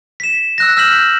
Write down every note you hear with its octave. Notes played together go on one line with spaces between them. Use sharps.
B6 E7
E6 F#6 A#6
E6 F6 G6 B6 E7 F#7